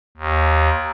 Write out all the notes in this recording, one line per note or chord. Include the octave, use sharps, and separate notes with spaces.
D#2